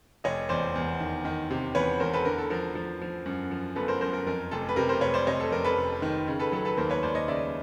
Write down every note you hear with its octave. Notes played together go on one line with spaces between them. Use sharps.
F1 C#5 D#5
E2 C5 D5
E2
D#3
D#3
C3
E2 B4 C#5
E2 A#4 C5
A4 B4
D3 A#4
A4
F3 A#4
F3
F3
F#2
F3
G1 A4 B4
A#4 C5
F#2 A#4 C5
A#4
F2 A#4
F1 A4
B4
C3 A#4
A#4 C5
F1 B4 C#5
C5 D5
C3 C#5 D#5
A4
F2 A#4
A4 B4
F1
D#3
C#3
A4 B4
F#3 A4 B4
A4 B4
D#2 A#4 C5
B4 C#5
D#2 C5 D5
C#5 D#5
C#3 D5 E5